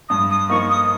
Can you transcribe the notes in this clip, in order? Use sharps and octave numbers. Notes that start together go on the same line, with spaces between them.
G2 D#6
D#6
F3 A#3 D#4 C#6
D#6